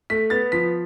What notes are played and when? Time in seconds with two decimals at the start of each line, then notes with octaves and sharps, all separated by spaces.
0.10 A3 B6
0.30 B3 A6
0.52 F3 B6